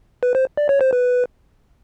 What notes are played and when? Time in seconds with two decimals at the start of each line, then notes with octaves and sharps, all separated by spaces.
0.23 B4
0.35 C5
0.57 D5
0.69 C#5
0.81 C5
0.93 B4